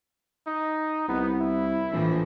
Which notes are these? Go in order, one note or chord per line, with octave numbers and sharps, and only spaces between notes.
D#4
C2 B3
E4
A#1 A2 E3 F3